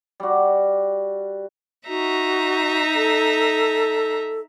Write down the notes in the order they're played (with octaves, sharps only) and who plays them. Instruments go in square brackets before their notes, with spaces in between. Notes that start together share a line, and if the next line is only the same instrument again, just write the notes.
[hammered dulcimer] G3 F#4
[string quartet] D#4 E5 A#5 [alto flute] F#4
[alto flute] A4